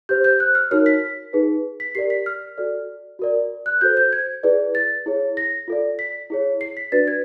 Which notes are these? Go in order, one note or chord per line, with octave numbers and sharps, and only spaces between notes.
G4 C5 G6
G6
F#6
F6
D#4 F#4 A#4 C#5 F6
B6
D#4 G#4 B4
B6
G4 A#4 D5 C7
B6
F6
F#4 A4 D5
F#4 A#4 D5
F#6
F#4 A4 C5 G6
G6
G#6
E4 G#4 B4 D5
A6
E4 G#4 C#5
A#6
F4 A4 D5
B6
E4 G#4 C#5
C7
B6
D4 F#4 B4 D5 A6
G#6